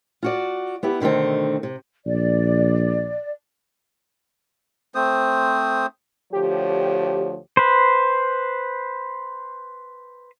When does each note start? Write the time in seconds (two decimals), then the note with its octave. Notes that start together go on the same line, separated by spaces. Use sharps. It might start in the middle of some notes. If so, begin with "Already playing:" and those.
0.23 F4 F#4 D5
0.83 B3 E4 G4
1.00 B2 D3 D#3 A3 C4
1.63 C3
2.06 A#1 D5
4.95 A3 C4 C5 D#6
6.32 D2 F3 G4 C#5
7.57 B4 C5